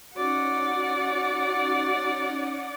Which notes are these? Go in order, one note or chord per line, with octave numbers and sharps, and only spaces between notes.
C#4 D#4 F#4 D5 F#5